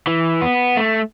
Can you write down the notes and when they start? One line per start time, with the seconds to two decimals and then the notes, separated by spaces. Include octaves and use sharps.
0.07 E3
0.42 B3
0.77 A3